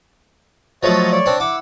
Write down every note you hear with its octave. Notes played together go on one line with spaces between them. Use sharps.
F3 F#3 A3 C#5 D#5
C#5 D5
C4 D4
E4 F#5 D6 E6